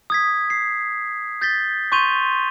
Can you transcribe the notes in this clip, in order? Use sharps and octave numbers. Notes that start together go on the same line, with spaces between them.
D#6 G#6 B6
C7
G6 A6 B6 G7
C6 C#6 G6 D#7 F7 G7